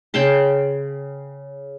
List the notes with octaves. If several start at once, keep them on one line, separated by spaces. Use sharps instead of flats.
C#3 G5 A5 C6